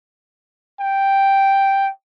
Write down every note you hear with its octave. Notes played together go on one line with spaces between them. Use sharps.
G5